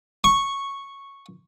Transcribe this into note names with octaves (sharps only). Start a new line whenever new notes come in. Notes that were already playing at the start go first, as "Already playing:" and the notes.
C#6